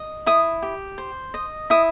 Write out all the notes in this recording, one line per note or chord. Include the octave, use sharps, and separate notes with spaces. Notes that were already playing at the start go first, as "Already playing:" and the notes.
Already playing: D#5
E4 D#6
G4
C5
D#5
E4 D#6